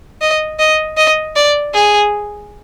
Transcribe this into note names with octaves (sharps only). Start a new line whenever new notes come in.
D#5
D#5
D#5
D5
G#4